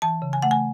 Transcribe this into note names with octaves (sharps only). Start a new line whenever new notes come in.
E3 A5
C#3
G#5
A3 F#5
G#5